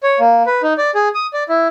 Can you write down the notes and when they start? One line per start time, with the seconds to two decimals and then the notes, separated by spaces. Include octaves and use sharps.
0.03 C#5
0.20 A#3
0.46 B4
0.63 D#4
0.78 D5
0.95 G#4
1.15 D#6
1.33 D5
1.49 E4